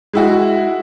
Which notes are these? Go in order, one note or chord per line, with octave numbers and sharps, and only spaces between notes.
G#3 E4 F#4